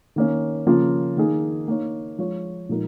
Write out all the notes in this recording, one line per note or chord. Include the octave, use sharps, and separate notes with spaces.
D#3 A#3 C#4
C#3 F3 A#3 C#4 F4
D#3 A#3 D#4 G#4
A#3 D#4 C#5
F3 G#3 F4 C#5
A#2 F3 G#3 D#4 A#4